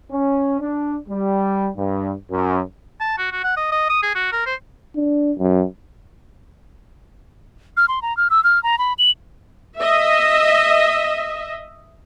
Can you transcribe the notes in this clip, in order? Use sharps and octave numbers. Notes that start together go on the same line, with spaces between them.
C#4
D4
G3
G2
F#2
A5
F#4
F#4
F#5
D#5
D#5
D#6
G#4
F#4
A#4
C5
D4
F#2
F6
C6
A#5
F6
E6
F6
A#5
B5
F#7
D#5 E5